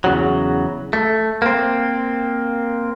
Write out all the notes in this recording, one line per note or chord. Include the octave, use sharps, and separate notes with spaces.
E2 C#3 F#3
A3
A#3 C4